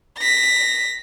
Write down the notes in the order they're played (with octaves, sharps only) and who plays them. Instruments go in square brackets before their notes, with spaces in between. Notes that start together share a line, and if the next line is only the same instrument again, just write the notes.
[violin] A#6 B6